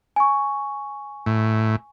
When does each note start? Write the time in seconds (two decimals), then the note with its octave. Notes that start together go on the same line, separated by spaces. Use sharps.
0.16 G#5 C#6
1.26 A2